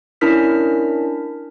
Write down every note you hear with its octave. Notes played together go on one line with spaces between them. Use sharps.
C#4 D4 E4 A#4 F6 B6